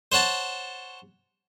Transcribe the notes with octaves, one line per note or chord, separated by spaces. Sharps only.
C5 C#5 F#5 A5